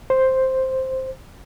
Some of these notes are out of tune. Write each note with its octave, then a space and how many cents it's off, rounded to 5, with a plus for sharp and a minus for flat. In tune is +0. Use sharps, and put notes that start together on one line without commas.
C5 +5